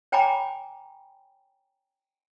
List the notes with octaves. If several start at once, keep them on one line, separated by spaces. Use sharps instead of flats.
C#5 G5 G#5 A#5 B5 D6